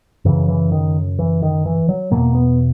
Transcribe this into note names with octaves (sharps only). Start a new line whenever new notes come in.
F#2 C#3 E3
E3
D#3
E3
D#3
E3
F#3
E2 B2 A#3
B3